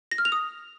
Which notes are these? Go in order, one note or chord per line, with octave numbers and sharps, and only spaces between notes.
A#6
F6
F7
D#6